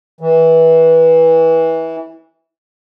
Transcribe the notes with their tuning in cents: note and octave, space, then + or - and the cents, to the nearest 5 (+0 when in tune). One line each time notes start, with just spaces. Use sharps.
E3 -20